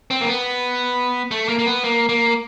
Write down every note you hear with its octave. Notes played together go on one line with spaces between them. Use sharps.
C4
A#3
B3
A3
A#3
A#3
B3
A#3
A#3